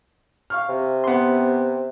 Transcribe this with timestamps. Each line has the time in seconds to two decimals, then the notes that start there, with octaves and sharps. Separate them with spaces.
0.50 F5 C#6 F6
0.69 C3
1.04 B3 C6